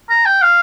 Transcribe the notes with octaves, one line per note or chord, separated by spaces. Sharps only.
A#5
G5
F5